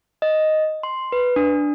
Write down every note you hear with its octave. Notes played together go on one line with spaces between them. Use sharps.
D#5
C6
B4
D4